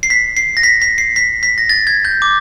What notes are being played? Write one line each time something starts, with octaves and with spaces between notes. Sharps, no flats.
C7
B6
C7
A#6
B6
B6
C7
B6
B6
A#6
A6
G#6
G6
D6